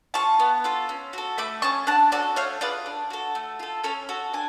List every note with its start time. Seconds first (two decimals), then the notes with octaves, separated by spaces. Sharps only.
0.14 F4 G#4 A5 C#6
0.40 B3
0.64 F4 A4
0.89 C#4
1.13 F#4 A4
1.38 A3 B5 D6
1.62 C#4 G#4 A5 C#6
1.87 D4 F#5 A5
2.12 F#4 A4 D5 F#5
2.36 A3 C#5 F5
2.61 F4 G#4 B4 D5
2.86 D4
3.10 F#4 A4
3.35 A3
3.59 F4 A4
3.84 C#4 A4 C#5
4.09 F#4 A4
4.33 D4 G#5